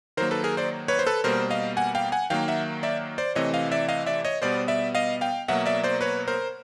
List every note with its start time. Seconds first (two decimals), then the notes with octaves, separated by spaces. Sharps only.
0.17 D#3 F#3 A#3 A#4 C5
0.31 A4 B4
0.44 G#4 A#4
0.57 C5 D5
0.88 B4 C#5
0.99 C5
1.07 A4 B4
1.24 B2 G3 A#3 A#4 C5
1.50 D#5 F5
1.77 F#5 G#5
1.95 F5 G5
2.12 F#5 G#5
2.30 D#3 F#3 A#3 F5 G5
2.48 E5 F#5
2.83 D5 E5
3.18 C5 D5
3.35 C3 E3 A3 C4 C#5 D#5
3.54 D#5 F5
3.72 D5 E5
3.88 D#5 F5
4.06 D5 E5
4.25 C#5 D#5
4.42 B2 G3 B3 C5 D5
4.68 D5 E5
4.95 D#5 F5
5.21 F5 G5
5.48 B2 F#3 A#3 E5 F#5
5.66 D5 E5
5.83 C5 D5
6.01 B4 C#5
6.28 A#4 C5